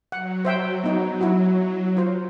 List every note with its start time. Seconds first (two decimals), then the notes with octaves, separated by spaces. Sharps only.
0.12 F#3 F#5
0.45 C5 E5 G5
0.84 F#3 B3 D#4
1.21 E4 F#4
1.97 F4 C5